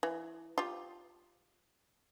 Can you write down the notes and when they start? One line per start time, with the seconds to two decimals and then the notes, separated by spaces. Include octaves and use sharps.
0.03 E3
0.58 F4 G4